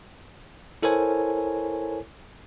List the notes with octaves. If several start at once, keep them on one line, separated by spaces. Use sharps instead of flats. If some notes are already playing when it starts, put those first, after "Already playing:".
E4 A4 A#4 C5 C#5 G#5